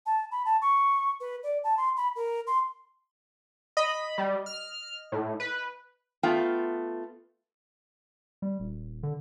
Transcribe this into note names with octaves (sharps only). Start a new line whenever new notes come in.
A5
B5
A5
C#6
B4
D5
A5
C6
B5
A#4
C6
D#5 B5
G3
F6
A2
B4
A3 B3 F4 G5
G3
D#1
D3